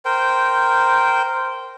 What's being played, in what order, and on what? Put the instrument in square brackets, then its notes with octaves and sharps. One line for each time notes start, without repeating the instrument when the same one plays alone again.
[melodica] A#4 C5 G5